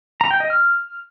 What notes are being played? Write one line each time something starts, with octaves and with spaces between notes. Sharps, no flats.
A#5
G5
D#5
F6